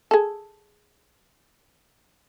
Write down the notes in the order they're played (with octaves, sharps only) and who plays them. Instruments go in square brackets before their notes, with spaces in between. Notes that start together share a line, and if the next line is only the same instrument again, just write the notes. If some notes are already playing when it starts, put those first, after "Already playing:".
[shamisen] G#4 A4